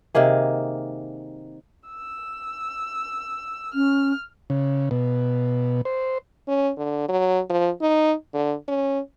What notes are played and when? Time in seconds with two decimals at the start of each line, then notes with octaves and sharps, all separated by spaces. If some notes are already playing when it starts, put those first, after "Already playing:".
0.15 C3 D#3 A#3 G#4
1.88 E6
3.74 C#4 F6
4.50 C#3
4.91 B2
5.85 C5
6.47 C#4
6.78 D3
7.09 F#3
7.49 F3
7.81 D#4
8.34 D3
8.68 C#4